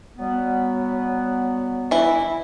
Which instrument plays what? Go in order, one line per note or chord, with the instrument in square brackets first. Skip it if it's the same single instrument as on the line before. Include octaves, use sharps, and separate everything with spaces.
[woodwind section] F#3 G3 B3
[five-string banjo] E3 E4